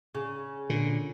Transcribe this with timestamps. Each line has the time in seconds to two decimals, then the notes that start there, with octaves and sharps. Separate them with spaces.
0.15 C#3
0.70 A#2 D3